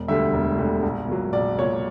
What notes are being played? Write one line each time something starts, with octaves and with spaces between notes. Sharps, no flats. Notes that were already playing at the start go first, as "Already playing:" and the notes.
Already playing: E1
D2 D3 G3 E5
E1
D2 D3 G3
A#1
A#2 F#3
A#1 D5
A#2 F#3 C#5